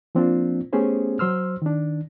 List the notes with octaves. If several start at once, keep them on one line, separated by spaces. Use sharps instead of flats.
F3 A#3 C4 D4 F4
A3 B3 C#4 G4 G#4 C5
F#3 C5 C6 E6 F6
D#3 D4